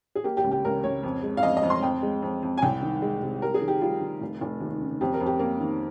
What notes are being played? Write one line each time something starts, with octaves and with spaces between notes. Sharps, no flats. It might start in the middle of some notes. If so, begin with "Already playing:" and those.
G#4
A#3 G4
G4
C#2
G4
C#2 A#4
C#2 C#5
F2
G#3
F5
F2 D#5
D#5
F2
C6
F2 G5
G#3
F2
F2
G#5
C2 G5
D#3
G#3
C3
G3 A#4
G#4
D#3
G4
G3 F4
D#3
F1
F1
D#2
C#3
F2 G4
A#4
F2
G4
A#3
D#3